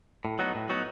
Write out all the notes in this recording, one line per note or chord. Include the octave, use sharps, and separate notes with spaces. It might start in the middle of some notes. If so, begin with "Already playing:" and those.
A2
F#3 B3 D#4 F#4
A2
F#3 B3 D#4 F#4